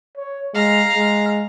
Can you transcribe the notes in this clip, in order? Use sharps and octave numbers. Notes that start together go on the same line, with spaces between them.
C#5
G#3 F5 A#5
G#3